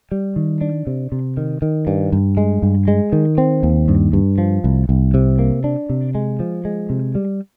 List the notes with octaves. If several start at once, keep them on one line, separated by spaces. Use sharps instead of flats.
G3
D#3
D4
C3
C3
D#3
D#3
G2
G2
G#3
G2
G#3
D#3
C4
D#2
G2
G2
F3
C2
C2
C3
A#3
D4
C3
G#3
F3
G#3
C3
G3